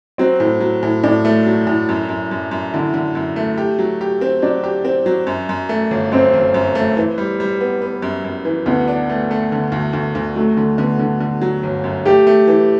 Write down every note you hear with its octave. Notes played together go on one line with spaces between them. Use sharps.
F#3 C4
A2
F#3
A2
A2 D4
A3
F#3
A2
F#2
F#2
F#2
F#2
D3 E4
D3
F#2
A3
G4
F#3
G4
C4
F#3 D4
G4
C4
F#3
F#2
F#2
A3
G1
F#2 C4
G1
F#2
A3
E3
G3
G3
B3
B3
F#2
F#2
E3
D2 B3
D4
A3
A3
D3
D2
D2
D2
F#3 A3
D3
D3 B3
D3
D3
F#3
G1
F#2
A3 G4
A3
E3